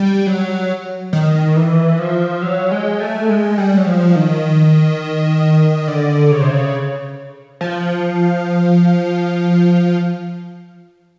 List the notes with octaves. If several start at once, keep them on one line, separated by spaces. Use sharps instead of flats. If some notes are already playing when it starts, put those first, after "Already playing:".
Already playing: G3
F#3
D#3
E3
F3
F#3
G#3
A3
G#3
G3
F#3
F3
D#3
D3
C#3
C3
C#3
F3